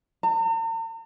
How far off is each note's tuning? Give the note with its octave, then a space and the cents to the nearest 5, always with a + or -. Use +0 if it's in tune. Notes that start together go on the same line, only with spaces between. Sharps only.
A#5 -45